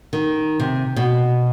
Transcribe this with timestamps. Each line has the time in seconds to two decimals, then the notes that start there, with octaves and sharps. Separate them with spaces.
0.13 D#3
0.60 C3
0.96 B2